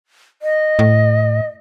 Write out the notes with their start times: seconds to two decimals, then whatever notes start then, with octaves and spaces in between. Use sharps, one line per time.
0.42 D#5
0.79 A2